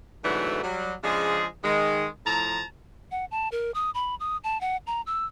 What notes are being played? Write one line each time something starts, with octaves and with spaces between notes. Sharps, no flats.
G#2 B2 D3 E3 F#3 A3
F#3 G3
C#3 F3 G#3 D4 G#4
D#3 G#3
A2 F3 A5 A#5
F#5
A5
A#4
D#6
B5
D#6
A5
F#5
A#5
E6